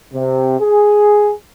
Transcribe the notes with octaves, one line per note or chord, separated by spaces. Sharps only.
C3
G#4